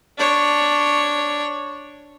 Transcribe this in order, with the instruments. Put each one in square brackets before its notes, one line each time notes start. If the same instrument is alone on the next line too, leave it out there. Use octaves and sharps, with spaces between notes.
[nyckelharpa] D4 C#5